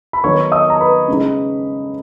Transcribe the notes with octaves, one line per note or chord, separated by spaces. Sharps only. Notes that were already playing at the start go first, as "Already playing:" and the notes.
B5
D#3 F#3 B3 D#4 C#5 C#6
D#5 D#6
A#5
B4 B5
C#3 G#3 D#4